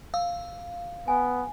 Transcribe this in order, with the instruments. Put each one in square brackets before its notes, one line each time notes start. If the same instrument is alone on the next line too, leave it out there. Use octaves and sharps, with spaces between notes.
[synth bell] F5 [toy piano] E6
[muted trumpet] B3 [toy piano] G#5